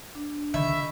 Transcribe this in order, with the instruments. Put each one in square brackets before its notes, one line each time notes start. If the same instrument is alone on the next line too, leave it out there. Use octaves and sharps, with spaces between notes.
[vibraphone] D4
[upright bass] D3 D#3 [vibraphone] D#5 B5 C#6 [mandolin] E5